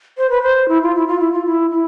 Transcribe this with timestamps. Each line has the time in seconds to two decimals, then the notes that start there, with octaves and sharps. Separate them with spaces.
0.18 C5
0.30 B4
0.42 C5
0.68 E4
0.82 F4
0.95 E4
1.07 F4
1.19 E4
1.32 F4
1.45 E4
1.71 E4